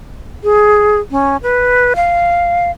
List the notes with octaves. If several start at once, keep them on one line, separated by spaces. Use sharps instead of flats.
G#4
C#4
B4
F5